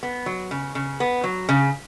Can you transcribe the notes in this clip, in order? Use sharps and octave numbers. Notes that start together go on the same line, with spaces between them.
B3
F#3
C#3
C#3
B3
F#3
C#3